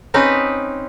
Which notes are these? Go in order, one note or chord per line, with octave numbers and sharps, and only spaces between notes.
C4 C#4 D#4 B4